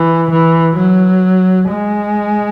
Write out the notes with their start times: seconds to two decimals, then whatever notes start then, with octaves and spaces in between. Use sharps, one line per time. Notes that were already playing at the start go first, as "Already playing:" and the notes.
Already playing: E3
0.31 E3
0.76 F#3
1.69 G#3